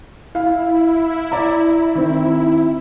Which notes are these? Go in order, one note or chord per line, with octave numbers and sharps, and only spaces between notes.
E4 F5
D5 A#5
D#3 C4